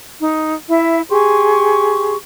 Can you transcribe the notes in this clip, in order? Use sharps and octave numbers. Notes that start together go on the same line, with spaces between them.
D#4
E4 E5
G4 G#4 C6 C#6